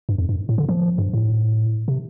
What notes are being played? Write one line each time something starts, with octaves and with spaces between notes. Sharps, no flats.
G2
F2
G2
A2
D3
F3
G2
A2
C3